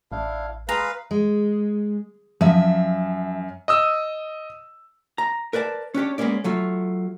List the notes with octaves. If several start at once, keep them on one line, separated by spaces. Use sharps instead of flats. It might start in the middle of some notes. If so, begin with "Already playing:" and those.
A1 D4 E4 F5
G#3 G#4 B4 F5 A#5
G#3
F#2 F3 F#3 E5
D#5 D#6 E6
A#5
A#4 B4 D5 F#5 A5
C#4 D4 G4 C#5
G#3 A#3 B3 C#4 D5
F#3 A3 F4